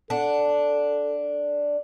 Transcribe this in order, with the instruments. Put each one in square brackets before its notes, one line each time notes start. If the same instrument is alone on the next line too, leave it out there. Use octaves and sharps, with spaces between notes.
[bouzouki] D4 F#5 [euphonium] A4